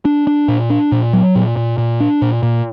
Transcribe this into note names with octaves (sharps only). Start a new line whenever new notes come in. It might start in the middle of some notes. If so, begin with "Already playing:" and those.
D4
D4
A#2
D4
A#2
F#3
A#2
A#2
A#2
D4
A#2
A#2